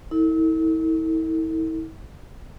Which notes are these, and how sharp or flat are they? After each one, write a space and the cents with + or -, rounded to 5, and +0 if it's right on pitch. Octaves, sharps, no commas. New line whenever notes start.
E4 -40 A4 +35